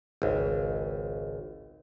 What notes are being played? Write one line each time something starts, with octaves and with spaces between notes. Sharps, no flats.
G#1 C#2